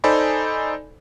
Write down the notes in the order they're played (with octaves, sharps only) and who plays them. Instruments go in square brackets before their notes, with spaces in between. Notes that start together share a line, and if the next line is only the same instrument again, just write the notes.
[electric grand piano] D#4 A4 C5 D5 G#5 B5